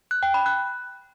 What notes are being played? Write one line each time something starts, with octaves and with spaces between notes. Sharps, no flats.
F#6
G5
B5
F#6